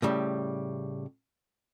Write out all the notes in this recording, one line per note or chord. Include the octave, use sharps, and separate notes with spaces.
A2 C#3 G3